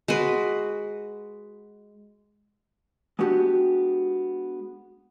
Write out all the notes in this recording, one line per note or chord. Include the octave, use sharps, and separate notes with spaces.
G#3 F#4 B4
G#3 B3 D4 F#4 G4